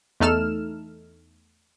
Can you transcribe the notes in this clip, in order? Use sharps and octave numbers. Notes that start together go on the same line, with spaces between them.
E2 A3 D#4 A4 F6 E7